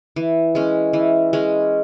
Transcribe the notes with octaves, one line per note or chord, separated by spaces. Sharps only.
E3
G#3 C#4
E3
G#3 C#4